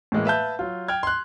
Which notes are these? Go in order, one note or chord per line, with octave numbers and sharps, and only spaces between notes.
A2 E3 G#3 A#3
B4 E5 F5 A5 G6
F#3 F4
G5 F6 G#6
C6 F#6